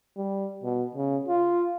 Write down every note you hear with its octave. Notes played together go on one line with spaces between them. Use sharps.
G3
B2
C#3
F4